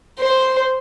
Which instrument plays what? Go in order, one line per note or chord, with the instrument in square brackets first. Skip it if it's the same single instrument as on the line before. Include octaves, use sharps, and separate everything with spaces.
[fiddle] C5